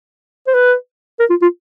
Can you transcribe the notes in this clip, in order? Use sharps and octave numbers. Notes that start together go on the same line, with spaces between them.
C5
B4
A#4
F4
F4